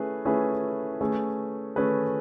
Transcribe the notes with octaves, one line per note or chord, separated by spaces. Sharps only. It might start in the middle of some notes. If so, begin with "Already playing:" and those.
Already playing: A3 C#4 E4 G#4 B4
A3 C#4 E4 G#4 B4
A3 C#4 G#4 B4
A3 C#4 G#4 B4